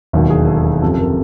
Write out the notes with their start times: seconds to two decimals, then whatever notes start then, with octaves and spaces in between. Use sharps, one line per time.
0.13 E1 D#2 D#3 F#3
0.30 G#4
0.47 A4
0.65 G#4
0.82 F#1 F2 C3 F3 A4
0.94 A4
0.99 A#4